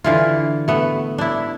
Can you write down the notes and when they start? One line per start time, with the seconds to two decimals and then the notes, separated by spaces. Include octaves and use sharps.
0.04 D3 E3 F4
0.68 A3 B3
1.18 D4 E4